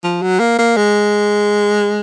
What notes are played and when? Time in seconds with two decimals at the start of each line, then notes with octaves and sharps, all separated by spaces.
0.04 F3
0.22 F#3
0.40 A#3
0.59 A#3
0.77 G#3